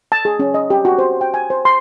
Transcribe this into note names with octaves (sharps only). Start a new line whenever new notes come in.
A5
G#4
C#4
D#5
G4
F#4
C5
G5
G#5
C5
C6